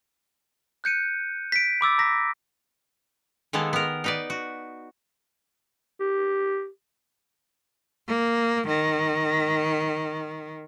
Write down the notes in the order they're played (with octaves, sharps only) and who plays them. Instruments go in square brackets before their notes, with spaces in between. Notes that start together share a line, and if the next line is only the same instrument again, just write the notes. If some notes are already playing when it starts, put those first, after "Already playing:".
[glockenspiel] F#6 G6 C#7 D#7
B6 D7
B5 D6 E6 A6
A#5 A#6 B6
[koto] D#3 G#3 A#3 B3 A4
B3 A#4
D#4 B4 D5
F#4
[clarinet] G4
[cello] A#3
D#3